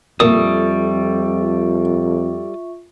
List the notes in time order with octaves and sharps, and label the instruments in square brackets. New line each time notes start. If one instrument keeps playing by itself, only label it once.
[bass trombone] F2 [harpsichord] A#2 [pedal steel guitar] G3 A4 D#6 [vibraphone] F4 E5 C#6